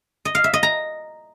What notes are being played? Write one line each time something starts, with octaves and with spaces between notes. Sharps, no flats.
D#5
F5
E5
D#5
A#5